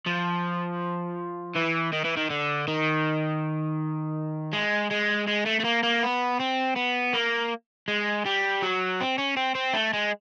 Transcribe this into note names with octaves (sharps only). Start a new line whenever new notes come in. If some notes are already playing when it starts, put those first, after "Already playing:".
F3
E3
D#3
E3
D#3
D3
D#3
G#3
G#3
G#3
A3
A3
A#3
A#3
B3
C4
B3
A#3
G#3
G3
F#3
C4
C#4
C4
C4
A3
G#3